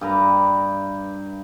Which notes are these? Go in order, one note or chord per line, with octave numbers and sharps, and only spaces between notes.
G2 B4 A#5